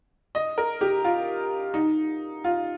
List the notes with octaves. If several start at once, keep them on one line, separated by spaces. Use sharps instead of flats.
D#5
A#4
G4
F4
D#4
F4